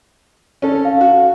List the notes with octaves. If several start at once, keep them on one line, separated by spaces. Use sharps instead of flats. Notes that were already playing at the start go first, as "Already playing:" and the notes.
C#4 A4
F5
F#4